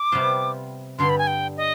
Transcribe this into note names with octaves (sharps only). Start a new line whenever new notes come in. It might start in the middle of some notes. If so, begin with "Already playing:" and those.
Already playing: D6
C3 G3 B3 F4 C5
G2 D3 G3 C6
B5
G#5
G5
D#5